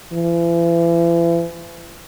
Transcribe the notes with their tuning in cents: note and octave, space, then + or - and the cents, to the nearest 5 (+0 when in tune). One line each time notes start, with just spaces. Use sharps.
E3 +40